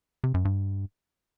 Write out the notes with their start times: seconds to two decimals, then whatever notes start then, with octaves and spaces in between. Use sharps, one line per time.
0.24 C3
0.34 F#2
0.45 G2